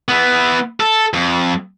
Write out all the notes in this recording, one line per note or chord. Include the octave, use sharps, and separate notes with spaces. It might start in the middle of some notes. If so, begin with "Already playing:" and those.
B3 E4
A4
F2